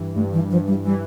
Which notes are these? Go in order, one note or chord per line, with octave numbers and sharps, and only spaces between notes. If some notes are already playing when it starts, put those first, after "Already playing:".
Already playing: G2 E3
G2 A3
E3
G2 F3
G3
E3 G3